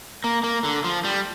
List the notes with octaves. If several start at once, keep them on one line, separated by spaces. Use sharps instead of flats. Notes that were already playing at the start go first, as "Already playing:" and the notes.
A#3
A#3
D3
F3
G3